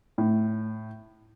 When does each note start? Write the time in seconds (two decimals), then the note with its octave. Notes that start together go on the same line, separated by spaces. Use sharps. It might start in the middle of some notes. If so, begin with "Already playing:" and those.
0.18 A2